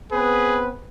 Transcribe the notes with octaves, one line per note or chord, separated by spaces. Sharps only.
B3 C4 G#4 B4